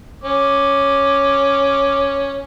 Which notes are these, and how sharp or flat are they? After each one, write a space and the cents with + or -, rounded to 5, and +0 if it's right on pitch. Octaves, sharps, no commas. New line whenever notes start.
C#4 +0 D6 +0